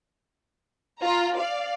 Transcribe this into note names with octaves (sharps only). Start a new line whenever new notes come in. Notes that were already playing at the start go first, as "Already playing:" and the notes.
F4 A#5
D5 F5